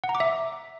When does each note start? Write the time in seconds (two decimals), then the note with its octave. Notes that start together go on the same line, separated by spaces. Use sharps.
0.04 F#5
0.09 A#5
0.15 D6
0.20 E5